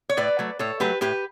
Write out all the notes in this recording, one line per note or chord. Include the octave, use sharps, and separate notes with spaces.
C#5
A2 B4 D5
F#3 A3
A2 A4 C#5
F#3 A3 G4 B4
A2 G4 B4